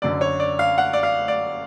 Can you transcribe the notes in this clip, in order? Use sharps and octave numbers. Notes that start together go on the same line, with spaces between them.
F#1 F#2 D3 D5
C#5
D5
F5
F#5
D5
F5
D5